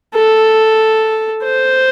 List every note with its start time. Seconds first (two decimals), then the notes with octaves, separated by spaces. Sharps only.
0.15 A4
1.44 C5